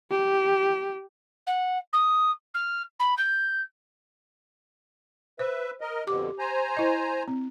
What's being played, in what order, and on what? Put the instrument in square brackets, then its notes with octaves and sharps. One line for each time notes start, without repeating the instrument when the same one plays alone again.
[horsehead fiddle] G4
[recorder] F#5
D#6
F6
B5
G6
[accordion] B4 E5 [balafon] C5
[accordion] A#4 D#5
[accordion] F2 B2 D3 [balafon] G4 D6
[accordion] C5 G#5 A#5
[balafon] E4 D#5
C4